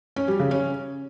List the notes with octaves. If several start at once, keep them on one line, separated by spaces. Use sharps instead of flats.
C#4
G3
C#3
C#4